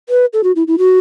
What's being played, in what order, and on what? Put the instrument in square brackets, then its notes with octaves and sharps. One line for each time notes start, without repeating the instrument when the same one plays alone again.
[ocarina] B4
A4
F#4
E4
E4
F#4